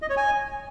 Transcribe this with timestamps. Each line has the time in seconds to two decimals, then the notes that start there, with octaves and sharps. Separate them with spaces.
0.02 D#5
0.09 C#5
0.17 G#5